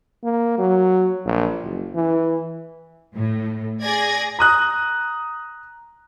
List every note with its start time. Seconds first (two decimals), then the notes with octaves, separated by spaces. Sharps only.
0.23 A#3
0.58 F#3
1.25 A#1
1.62 F#1
1.95 E3
3.16 A2
3.82 G#4 D5 G#6 A#6
4.39 A#5 D#6 F#6